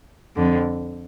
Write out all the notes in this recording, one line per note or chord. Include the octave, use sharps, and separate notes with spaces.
F2 D3